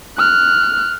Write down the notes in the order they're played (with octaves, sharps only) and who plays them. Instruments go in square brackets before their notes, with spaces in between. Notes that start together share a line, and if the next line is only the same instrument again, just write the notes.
[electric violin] F6 F#6